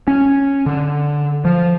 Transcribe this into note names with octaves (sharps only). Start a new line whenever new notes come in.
C#4
D3
F3